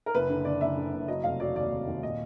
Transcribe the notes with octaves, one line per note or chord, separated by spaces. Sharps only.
A#4
F#1 B4
D3
D3 D5
F#1 E5
D3
F#1
F#3 D#5
F1 F5
F#3 D5
D#2 D5
F1
D#2
A#2 D#5